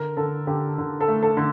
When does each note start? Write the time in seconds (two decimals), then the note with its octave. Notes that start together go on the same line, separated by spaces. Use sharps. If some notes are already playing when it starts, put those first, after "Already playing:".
Already playing: D3 A#4
0.17 D3 A4
0.47 D3 G4
0.78 D3
1.01 A4
1.08 A3
1.23 A4
1.37 D3